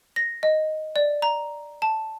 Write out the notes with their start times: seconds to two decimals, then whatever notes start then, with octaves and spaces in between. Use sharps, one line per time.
0.16 A#6
0.43 D#5
0.96 D5
1.22 A#5
1.82 A5